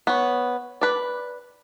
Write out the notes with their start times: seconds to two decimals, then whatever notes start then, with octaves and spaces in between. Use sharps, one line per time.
0.07 B3 C#5
0.81 B4 D5